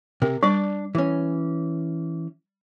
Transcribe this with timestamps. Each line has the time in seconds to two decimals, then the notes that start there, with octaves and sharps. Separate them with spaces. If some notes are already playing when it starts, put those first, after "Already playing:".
0.22 C3 A#4
0.43 G3 D4 D5
0.95 E3 C#4